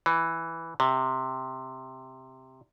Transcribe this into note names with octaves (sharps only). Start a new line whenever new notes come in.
E3
C3